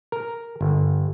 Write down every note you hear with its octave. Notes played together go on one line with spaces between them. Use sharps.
A#4
G1